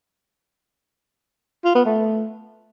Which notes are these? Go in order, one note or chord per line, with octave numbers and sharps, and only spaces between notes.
F4
B3
A3